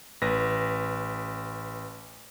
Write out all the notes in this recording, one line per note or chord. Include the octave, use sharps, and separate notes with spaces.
A1 B4 A#6